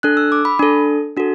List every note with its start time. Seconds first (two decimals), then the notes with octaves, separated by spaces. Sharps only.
0.03 D4 A4 F#6
0.17 E6
0.32 D6
0.45 B5
0.59 D4 A4
1.17 D4 F#4 A4